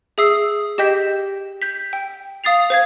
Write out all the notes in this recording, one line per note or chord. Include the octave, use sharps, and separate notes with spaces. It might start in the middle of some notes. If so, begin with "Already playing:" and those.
G#4 E5 D#6 E6 C7
G4 D#5 G5 G6 B6
G6 B6
G5
F5 D#6 A6 C7 F7
C5 F5 G#6